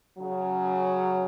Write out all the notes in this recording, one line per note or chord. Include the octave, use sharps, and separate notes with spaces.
C#3 F#3